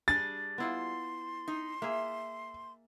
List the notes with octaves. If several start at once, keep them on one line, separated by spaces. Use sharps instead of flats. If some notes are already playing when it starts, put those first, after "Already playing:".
G3 D4 G#4 A6
B3 E4 F4 C6
D#4
A#3 G#4 E5